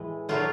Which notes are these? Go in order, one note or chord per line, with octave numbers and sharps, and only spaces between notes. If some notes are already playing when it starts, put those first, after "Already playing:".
Already playing: A2 E3 G#3
A#2 F#3 A3 F4